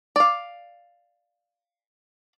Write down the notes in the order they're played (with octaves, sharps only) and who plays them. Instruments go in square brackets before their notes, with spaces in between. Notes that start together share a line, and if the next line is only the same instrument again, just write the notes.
[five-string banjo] D5 F5